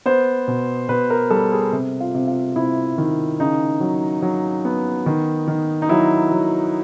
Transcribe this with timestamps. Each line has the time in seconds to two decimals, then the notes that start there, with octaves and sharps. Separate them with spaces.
0.06 B3 C5
0.48 B2
0.89 B2 B4
1.10 A#4
1.30 G3 A4
1.52 G#4
1.72 C3
2.00 F4
2.15 C3
2.28 F4
2.56 C3 E4
2.98 D#3
3.40 C#3 D#4
3.80 F#3
4.22 F#3
4.65 B3
5.06 D#3
5.48 D#3
5.82 D#4
5.89 F#3 E4
6.31 F#3